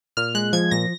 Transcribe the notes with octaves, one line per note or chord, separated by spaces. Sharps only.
A#2 F6
G#3 F#6
F3 G#6
A#2 A#6